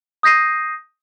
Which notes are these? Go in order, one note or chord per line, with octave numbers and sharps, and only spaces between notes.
D#6 G6 A#6 C7 D#7